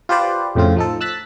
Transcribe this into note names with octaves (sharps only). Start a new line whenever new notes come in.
F4 G4 B4 C5 D5
F2 A2 C#3 C4 F4
F3 D#4 A4
E6 F#6 A6 B6